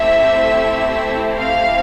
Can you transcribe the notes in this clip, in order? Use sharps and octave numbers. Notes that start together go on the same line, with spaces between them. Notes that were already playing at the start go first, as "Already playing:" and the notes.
Already playing: A3 C4 E4 G4 E5
F5